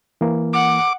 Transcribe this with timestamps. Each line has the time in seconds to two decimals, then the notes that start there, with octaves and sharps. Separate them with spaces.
0.21 E3 A#3
0.53 F#5 D6